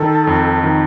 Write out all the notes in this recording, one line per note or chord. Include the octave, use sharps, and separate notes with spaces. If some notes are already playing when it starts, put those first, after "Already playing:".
Already playing: D#3 A4
F2
D#3